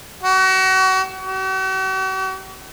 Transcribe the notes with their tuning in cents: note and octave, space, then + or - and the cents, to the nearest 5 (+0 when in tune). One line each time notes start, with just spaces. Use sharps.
F#4 +35
F#4 +45